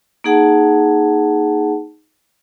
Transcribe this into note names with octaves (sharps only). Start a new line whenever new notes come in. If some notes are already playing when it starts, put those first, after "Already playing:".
A#3 D#4 G#4 F#5 A5